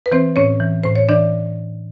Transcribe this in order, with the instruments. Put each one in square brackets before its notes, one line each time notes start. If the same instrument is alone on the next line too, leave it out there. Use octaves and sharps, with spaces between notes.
[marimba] B4
E3 C4 C5
A2 C#4 C#5
E3
A2 C5
C#5
E3 D4 D5